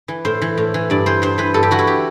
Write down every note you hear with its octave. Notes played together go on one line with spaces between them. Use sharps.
E3
A2 C5
E3
A2
E3
G2 D5
E3 C5
G2 C5
E3 B4
G2 A4
G4
E3 F#4
E4
G4